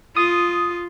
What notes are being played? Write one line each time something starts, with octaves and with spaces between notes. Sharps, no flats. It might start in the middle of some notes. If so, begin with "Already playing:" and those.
F4 D#6